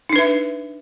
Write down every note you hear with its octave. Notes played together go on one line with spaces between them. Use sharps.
D4 D#4 B4 E5